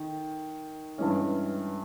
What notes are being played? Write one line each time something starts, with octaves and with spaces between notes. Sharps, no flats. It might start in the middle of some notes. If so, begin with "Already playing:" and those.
Already playing: D#3
G2 E3 G#3 C#4